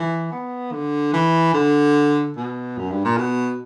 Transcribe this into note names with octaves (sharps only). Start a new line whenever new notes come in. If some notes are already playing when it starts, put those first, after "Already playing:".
Already playing: E3
B3
D3
E3
D3
B2
F#2
G2
A#2
B2